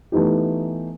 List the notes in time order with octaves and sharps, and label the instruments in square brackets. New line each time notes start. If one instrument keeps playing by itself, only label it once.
[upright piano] E3 A3 B3 D#4 G4